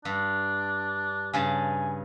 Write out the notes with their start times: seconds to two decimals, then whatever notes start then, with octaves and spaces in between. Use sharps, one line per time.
0.05 G2 D4
1.34 G2 C#3 G#5 A5